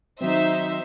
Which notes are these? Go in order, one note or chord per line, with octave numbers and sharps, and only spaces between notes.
D#3 F#3 C4 D#4 C5 E5